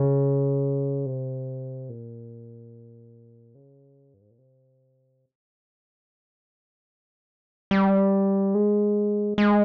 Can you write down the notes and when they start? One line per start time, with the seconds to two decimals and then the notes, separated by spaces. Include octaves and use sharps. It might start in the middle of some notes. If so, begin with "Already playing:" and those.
Already playing: C#3
1.06 C3
1.89 A#2
3.55 C#3
4.14 G2
4.21 G#2
4.31 A#2
4.38 C3
7.71 G3
8.54 G#3
9.38 G#3